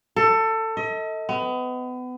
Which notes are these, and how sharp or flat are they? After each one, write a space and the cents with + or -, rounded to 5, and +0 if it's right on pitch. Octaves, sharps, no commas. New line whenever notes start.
A4 +20
D#5 +40
B3 +30